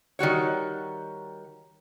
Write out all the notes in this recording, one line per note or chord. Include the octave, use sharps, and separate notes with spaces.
D#3 G3 F#4 C#5